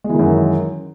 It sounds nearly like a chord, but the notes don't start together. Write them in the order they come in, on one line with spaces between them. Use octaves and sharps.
G#3 E3 D#3 F#2